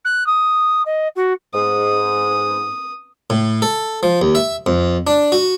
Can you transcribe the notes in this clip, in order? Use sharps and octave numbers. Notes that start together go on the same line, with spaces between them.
F#6
D#6
D#5
F#4
G#2 D#6
A2
A4
F3
D#2
E5
F2
D4
F#4